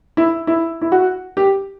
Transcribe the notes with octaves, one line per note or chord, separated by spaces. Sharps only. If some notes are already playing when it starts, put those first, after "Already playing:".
E4
E4
E4
F#4
G4